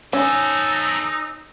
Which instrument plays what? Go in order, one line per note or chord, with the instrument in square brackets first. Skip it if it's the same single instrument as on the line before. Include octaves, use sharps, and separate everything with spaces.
[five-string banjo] C#4 [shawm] D#4 [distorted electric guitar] A4 C5 [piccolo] E6